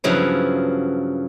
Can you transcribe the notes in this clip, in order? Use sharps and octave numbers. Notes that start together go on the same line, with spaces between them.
G2 C#3 F3 F#3 B3 E4